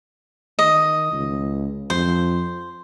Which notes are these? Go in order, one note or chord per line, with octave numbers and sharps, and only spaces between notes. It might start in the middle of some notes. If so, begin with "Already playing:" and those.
D#3 D#5
C#2
F2 C5